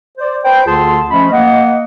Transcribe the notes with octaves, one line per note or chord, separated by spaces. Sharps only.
C5 D5
B4 C5 G5
D2 D3 F4 G#4 A5 C6
F3 A3 C#4 D#5 B5
A#3 D#5 F#5